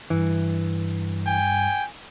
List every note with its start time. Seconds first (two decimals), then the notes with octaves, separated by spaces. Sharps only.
0.10 G2 E3
1.27 G5 G#5